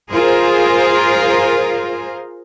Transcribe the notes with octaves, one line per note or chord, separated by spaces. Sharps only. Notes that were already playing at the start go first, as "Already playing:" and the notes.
F4 G#4 A#4 C5